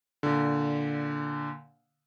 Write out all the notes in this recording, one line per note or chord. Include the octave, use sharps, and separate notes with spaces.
A#2 D3